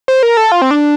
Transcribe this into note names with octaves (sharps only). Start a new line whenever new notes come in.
C5
A#4
A4
F4
C4
D4